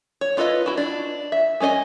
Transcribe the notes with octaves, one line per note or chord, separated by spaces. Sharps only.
C#5
D4 F4 A4 B4 D#5
E4 F#4
D4
E5
G#3 C#4 C5 D#5 G#5